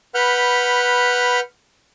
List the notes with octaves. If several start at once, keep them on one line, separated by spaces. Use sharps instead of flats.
B4 F#5 B5 F6 G6